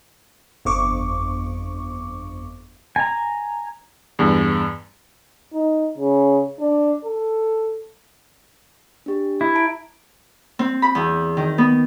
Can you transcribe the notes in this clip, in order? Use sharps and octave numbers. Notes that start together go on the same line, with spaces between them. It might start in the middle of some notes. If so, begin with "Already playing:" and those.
G1 F2 C#6 D6
G#5 A#5
E2 G2
D#4
C#3
D4
A4
D4 G4
E4
A5 A#5 D7
C4
B5
E2
D#3
B3